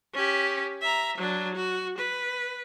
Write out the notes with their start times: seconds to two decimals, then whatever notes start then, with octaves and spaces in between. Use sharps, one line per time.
0.14 C#4 G4
0.82 E5 A#5
1.18 F#3 D4
1.55 F#4
1.99 B4